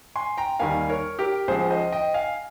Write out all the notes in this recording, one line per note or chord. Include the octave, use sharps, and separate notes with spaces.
G#5 C6
G5 A#5
D#2 D#3 G3 A#3 F5 G#5
A#4 C#5
G4 A#4
C#2 C#3 F3 G#4 C5
C5 D#5
D#5 G5
F5 G#5